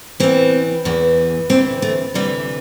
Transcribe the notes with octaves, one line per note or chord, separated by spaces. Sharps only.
E2 E3 C4
E2 E3
D2 C3 E3 C4
A3
D2 C3 E3 G3